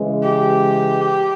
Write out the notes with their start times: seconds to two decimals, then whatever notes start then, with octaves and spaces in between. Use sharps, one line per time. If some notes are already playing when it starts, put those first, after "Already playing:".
Already playing: C#3 E3 G#3
0.23 G4